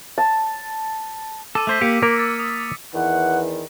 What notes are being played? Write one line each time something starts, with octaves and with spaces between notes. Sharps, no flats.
A5
A4 D6 E6 D#7
A3 C5 E6 B6
A#3 G4 C#7
A#3 A#4 E6
A6
D#6
E2 D#3 E3 F#5